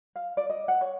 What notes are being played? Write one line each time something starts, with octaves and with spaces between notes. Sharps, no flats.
F5
D5
D#5
F#5
C#5